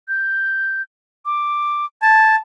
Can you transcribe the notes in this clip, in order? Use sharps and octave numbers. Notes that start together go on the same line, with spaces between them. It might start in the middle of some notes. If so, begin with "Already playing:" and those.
G6
D6
A5 G#6